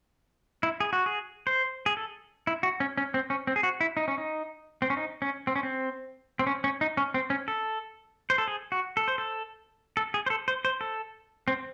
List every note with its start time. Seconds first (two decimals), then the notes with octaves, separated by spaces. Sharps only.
0.63 E4
0.80 G#4
0.93 F#4
1.06 G#4
1.47 C5
1.86 G#4
1.97 A4
2.47 E4
2.63 F#4
2.80 C#4
2.97 C#4
3.14 C4
3.30 C#4
3.47 C4
3.56 G#4
3.63 F#4
3.81 E4
3.97 D#4
4.08 C#4
4.18 D#4
4.82 C4
4.90 C#4
4.97 D#4
5.22 C#4
5.47 C4
5.56 C#4
5.63 C4
6.39 C4
6.47 C#4
6.64 C#4
6.81 D#4
6.97 C#4
7.14 C4
7.30 C#4
7.48 A4
8.30 C5
8.38 A4
8.48 G#4
8.72 F#4
8.97 A4
9.08 C5
9.18 A4
9.97 A4
10.14 G#4
10.26 C5
10.30 A4
10.48 C5
10.65 C5
10.81 A4
11.48 C4